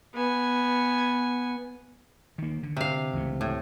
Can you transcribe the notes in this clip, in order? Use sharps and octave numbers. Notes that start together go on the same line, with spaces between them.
B3 G#5
D#3 A#3
D3
C3 F5
C#2 E3 A3
A2